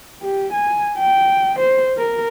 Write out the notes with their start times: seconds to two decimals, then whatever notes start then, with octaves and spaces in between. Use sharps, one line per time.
0.22 G4
0.53 G#5
0.98 G5
1.59 C5
1.98 A#4